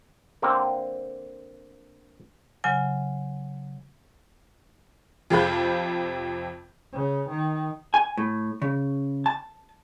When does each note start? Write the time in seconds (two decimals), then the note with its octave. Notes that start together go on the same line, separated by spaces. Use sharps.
0.42 D3 A#3 C4
2.64 C#3 F#3 G#5
5.30 F2 C3 A4 F5 B5 G6
6.92 C#3
7.29 D#3
7.94 G#5
8.17 A2
8.62 C#3
9.26 A5